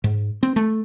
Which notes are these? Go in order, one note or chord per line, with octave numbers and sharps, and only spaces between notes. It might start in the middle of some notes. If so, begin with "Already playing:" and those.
G#2
C4
A3